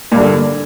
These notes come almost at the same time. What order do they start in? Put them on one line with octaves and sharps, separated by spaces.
A#2 G2 D3